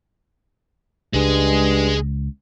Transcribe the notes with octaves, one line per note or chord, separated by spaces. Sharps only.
C#2 G2 G#3 G#4